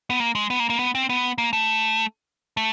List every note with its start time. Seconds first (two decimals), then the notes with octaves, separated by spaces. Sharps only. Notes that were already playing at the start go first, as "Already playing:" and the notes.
0.10 B3
0.20 A#3
0.35 G#3
0.50 B3
0.60 A#3
0.70 A#3
0.79 B3
0.95 C4
1.09 B3
1.38 A#3
1.53 A3
2.57 A3